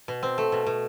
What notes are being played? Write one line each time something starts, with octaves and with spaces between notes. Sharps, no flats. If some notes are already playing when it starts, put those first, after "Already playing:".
B2
C4
A3
B2
B2